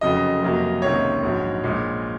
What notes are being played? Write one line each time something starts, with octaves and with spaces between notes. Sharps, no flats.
F1 F2 C#3 F#3 D#5
F2 C3 F#3 A#3
C#2 C3 D#3 A#3 C#5
A#1 G#2 F#3
A#1 A#2 G#3